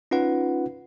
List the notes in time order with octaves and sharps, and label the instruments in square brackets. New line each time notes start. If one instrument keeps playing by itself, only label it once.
[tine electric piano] C#4 D#4 F4 B4 F#5